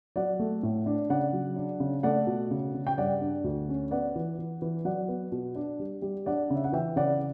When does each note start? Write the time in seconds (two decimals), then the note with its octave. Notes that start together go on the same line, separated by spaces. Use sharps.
0.16 F#3 D5 F#5
0.39 A3
0.63 A2
0.86 D4
1.10 C#3 D5 F#5
1.33 F#3
1.56 D4
1.80 C#3
2.03 A3 D5 F#5
2.27 B2
2.51 C#3
2.74 C#3
2.87 G5
2.98 G2 D5 F#5
3.21 D4
3.44 D2
3.69 C#4
3.91 B3 D5 F#5
4.15 E3
4.39 E3
4.62 E3
4.85 F#3 D5 F#5
5.08 B3
5.32 B2
5.55 D4
5.79 G3
6.02 G3
6.26 D4 D5 F#5
6.50 C#3
6.56 E5
6.64 F#5
6.72 E3 E5 G5
6.96 C#3 D5 F#5